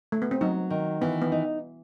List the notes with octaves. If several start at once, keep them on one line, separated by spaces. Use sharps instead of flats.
A3
B3
C4
F#3 D#4
D#3
E3 B3
B3
D#4